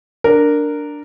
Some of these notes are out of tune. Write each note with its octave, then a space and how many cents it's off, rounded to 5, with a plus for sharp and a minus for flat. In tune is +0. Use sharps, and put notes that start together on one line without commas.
D4 +0 A#4 -10